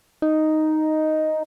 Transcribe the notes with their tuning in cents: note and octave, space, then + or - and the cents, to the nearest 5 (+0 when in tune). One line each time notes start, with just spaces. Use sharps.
D#4 +0